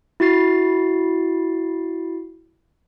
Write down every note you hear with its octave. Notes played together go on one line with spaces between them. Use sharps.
E4 F#4 A6 C7